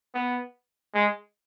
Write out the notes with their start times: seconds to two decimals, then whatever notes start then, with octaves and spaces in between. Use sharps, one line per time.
0.15 B3
0.94 G#3